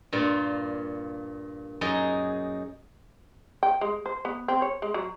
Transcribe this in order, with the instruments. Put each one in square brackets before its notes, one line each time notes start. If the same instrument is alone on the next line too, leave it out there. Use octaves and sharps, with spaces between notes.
[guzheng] G2 A#2 F4
F#2 D#4 G#4
[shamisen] G5
G#3
C5
B3
C4
C#5
G#3
F#3